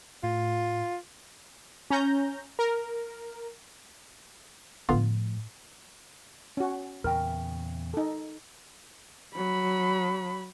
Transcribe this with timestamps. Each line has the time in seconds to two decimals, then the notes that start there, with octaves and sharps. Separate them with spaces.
0.23 A2 F4
1.90 C#4 A#5 G6
2.59 A#4
4.89 A2 D3 F3 B3 F4
6.57 C#4 F#4
7.04 E2 A#2 C#3 A#4 G5 F6
7.94 D#4 A4
9.35 F#3 B5